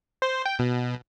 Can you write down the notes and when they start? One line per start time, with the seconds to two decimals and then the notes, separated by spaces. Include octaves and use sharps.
0.22 C5
0.46 G5
0.59 B2